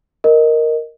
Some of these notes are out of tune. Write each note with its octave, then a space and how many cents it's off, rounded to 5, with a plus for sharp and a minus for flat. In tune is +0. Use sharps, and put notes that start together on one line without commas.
A#4 +0 D#5 +0